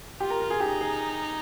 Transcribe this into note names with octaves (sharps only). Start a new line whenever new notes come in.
F4 G4
A#4
A#4
G#4
D#4 G4
G#4